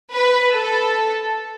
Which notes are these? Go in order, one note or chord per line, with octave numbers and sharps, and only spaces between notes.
B4
A4